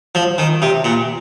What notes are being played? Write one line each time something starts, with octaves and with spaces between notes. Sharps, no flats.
F3
D#3
C3
A#2